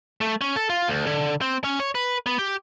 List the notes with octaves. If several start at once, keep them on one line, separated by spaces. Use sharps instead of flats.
A3
C#4
A4
F4
D2
D3
C4
C#4
C#5
B4
B3
G4